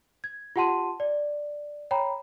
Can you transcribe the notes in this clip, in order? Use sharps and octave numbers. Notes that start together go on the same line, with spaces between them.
G#6
F4 G4 F#5 A5 C6 D#7
D5
C#5 G5 A#5 B5